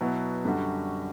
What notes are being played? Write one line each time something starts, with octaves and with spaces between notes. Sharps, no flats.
B2 F#3 B3 E4
F#2 D3 G3 D4 F#4